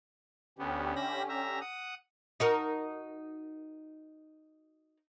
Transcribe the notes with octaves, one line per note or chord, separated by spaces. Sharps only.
D2 D3 B3 C#4 G4
E5 B5 A#6
E5 A#5
F#5 D#6
D#4 F#4 A#4